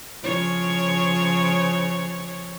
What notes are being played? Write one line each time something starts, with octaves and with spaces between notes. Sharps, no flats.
C#3 F3 C#5